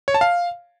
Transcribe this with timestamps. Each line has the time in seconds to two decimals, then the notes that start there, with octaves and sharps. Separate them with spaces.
0.08 C#5
0.14 A5
0.21 F5